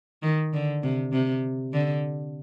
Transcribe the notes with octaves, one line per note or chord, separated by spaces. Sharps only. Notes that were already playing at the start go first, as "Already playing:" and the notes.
D#3
D3
C3
C3
D3